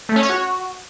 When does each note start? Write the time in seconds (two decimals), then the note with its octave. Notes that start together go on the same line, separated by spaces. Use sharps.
0.09 A3
0.16 C#4
0.23 C#5
0.29 F#4